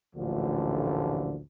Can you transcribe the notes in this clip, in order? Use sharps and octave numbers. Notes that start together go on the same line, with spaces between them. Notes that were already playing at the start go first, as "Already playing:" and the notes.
A1 D2 A#2 D3 F3